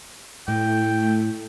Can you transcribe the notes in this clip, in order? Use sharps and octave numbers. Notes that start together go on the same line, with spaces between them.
A2 A3 G5